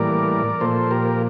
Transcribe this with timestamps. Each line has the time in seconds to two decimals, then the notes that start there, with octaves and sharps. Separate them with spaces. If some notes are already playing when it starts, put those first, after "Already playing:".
Already playing: A2 E3 G3 A#3 A#4 D5
0.60 A#2 F3 A#3 A4 C5
0.91 G4 A#4